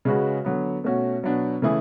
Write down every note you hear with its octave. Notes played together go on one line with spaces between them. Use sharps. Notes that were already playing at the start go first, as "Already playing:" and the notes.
C#3 G#3 C#4 F#4 B4
D3 F#3 B3
B2 A3 C#4 F#4
B2 F#3 B3 D4
C#3 E3 A3 E4 G#4